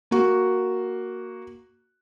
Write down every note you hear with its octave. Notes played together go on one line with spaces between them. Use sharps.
A#3 F#4